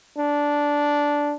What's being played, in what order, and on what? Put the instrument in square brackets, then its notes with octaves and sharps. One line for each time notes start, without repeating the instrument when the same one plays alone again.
[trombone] D4